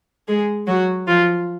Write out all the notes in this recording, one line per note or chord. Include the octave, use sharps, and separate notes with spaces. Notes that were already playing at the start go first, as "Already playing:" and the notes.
G#3 G#4
F#3 F#4
F3 F4